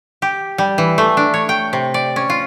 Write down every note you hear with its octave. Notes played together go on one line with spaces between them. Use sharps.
G4
G3
E3
A3
D4
C#5
G5
C3
D5
C#4
F4